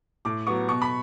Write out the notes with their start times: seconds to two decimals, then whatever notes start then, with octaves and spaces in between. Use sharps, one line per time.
0.25 A2 D6
0.47 F#3 B3 C#6
0.68 B2 C#6
0.82 B5